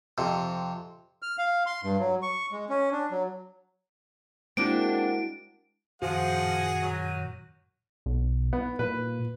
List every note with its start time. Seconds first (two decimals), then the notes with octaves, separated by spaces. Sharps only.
0.18 F2 C3
1.22 F6
1.38 F5
1.66 C6
1.83 G2
1.99 F#3
2.22 C#6
2.52 G#3
2.70 C#4
2.92 D4
3.11 F#3
4.57 G#3 A#3 C4 D4 E4 F#4 F#5 D7
6.02 F#2 A#2 D#3 F3 F#4 G#4 F#5
6.82 F#3
8.06 B1
8.53 B3
8.79 A#2 B4